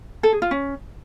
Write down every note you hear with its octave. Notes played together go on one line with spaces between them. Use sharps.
A4
G#4
F4
C#4